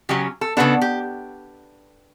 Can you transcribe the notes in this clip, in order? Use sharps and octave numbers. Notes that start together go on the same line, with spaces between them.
C#3 F#3 C#4 G4
A4
C#3 E3 B3 D4 A4
G4